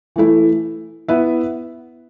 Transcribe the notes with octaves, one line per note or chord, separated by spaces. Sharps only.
E3 A3 E4
B3 E4 B4 E5